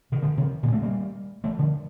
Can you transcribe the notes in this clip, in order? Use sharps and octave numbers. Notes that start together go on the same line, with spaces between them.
C3 D#3
D3 F3
C3 D#3
A#2 D3
A3 C4
G3 A#3
F3 A3
D3 F3